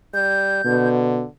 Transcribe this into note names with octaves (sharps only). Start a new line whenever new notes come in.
G3 G6
B2 D3